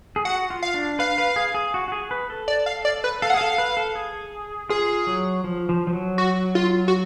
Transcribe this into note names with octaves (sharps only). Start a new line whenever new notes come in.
G#4
F#4 F#5
F4
F5
D4
B4 F5
B4
G#4
G#4
F#4
F#4
G#4
B4
A4
D5
F5
D5
B4
A4 F5
F#5
G#4
A4 F5
B4
A4
G#4
F4 G#4
F#3
F3
F3
F3
F#3
F#4
F4
F#4